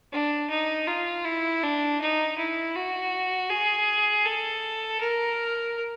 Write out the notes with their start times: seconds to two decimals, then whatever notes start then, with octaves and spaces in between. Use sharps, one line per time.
0.12 D4
0.50 D#4
0.88 F4
1.25 E4
1.63 D4
2.01 D#4
2.38 E4
2.75 F#4
3.50 G#4
4.26 A4
5.00 A#4